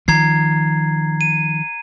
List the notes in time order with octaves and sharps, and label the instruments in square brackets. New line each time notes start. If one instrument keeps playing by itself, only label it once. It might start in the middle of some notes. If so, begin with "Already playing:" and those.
[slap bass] D#3 F3 [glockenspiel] A#5 G#6 C7
[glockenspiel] D#7